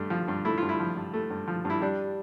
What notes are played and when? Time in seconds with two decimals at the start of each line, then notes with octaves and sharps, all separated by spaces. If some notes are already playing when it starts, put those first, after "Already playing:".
Already playing: G2 A3
0.10 F3
0.28 G2
0.45 A3 E4
0.58 G2 F4
0.69 E4
0.80 F3
0.96 G2
1.14 A3
1.30 G2
1.48 F3
1.65 G2
1.70 E4
1.81 G3 D4